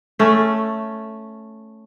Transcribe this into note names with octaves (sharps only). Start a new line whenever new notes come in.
A3 C#4